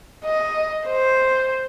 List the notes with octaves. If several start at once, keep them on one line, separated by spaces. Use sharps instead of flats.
D#5
C5